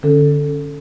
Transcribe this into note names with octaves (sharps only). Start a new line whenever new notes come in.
D3 C#4 A4